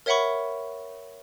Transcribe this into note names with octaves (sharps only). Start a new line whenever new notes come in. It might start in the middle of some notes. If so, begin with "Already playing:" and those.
A#4 C#5 E5 F#5 B5 C#6